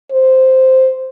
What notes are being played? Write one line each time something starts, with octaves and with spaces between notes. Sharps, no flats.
C5